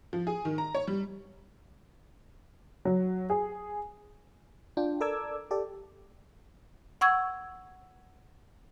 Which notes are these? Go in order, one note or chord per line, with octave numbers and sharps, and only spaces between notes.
F3
G#4
D#3
A#5
C#5
G3
F#3
G#4
D4 F4 G5
A4 A#4 D5 D6 E6 G#6
G4 A4 D5
F#5 C#6 E6 G#6